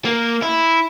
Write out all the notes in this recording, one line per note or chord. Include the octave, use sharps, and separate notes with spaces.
A#3
E4